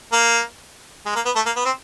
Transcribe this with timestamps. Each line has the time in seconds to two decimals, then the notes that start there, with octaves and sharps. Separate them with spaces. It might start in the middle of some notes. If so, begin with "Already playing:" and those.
0.12 A#3
1.06 G#3
1.15 A#3
1.25 B3
1.36 A3
1.46 A#3
1.56 B3
1.65 C4